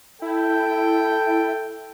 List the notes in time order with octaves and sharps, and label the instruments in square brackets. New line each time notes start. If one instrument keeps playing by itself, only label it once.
[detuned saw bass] E4 [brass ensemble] A4 G5